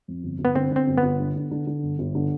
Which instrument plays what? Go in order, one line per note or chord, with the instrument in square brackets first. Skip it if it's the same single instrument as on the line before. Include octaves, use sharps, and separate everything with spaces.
[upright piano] F2
G1
G1
[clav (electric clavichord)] B3
[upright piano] D3 [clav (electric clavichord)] C4
[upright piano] D3
[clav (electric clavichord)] C4
[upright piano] G1
[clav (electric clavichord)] B3
[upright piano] G1
D3
D3
D3
D3
G1
G1
D3